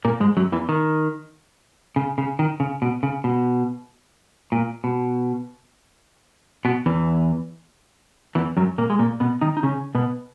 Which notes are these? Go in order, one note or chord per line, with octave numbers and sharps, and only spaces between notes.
A#2 A#3
G#2 G#3
F#2 F#3
E2 E3
D#3
C#3
C#3
D#3
C#3
B2
C#3
B2
A#2
B2
B2 B3
E2 E3
E2 E3
F#2 F#3
A#2 A#3
G#3
A#2 A#3
B2 B3
D#3 D#4
D#4
C#3 C#4
B2 B3